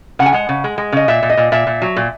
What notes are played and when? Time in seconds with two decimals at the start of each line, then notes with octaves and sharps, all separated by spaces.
0.19 C#3 F#5
0.26 G#5
0.33 G#3 F#5
0.49 C#3
0.64 G#3
0.78 G#3
0.92 C#3 D#5
1.08 A#2 E5
1.22 A#2
1.30 D#5
1.37 A#2
1.52 A#2 E5
1.67 A#2
1.82 F#3
1.96 A#2